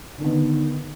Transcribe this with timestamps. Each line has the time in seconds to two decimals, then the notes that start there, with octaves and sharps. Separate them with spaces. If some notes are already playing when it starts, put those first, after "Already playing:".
0.18 D3
0.21 D#3
0.24 B3